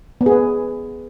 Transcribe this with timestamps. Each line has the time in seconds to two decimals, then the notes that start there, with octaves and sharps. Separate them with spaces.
0.21 B3
0.26 G#4
0.32 B4